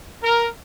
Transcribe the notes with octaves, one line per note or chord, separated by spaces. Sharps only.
A#4